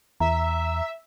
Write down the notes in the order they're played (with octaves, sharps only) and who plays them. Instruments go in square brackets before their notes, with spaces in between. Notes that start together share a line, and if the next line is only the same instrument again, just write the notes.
[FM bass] E2 [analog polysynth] E5 [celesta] A#5